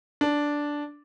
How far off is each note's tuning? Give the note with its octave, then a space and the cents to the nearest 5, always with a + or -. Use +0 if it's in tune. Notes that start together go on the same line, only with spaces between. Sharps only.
D4 -5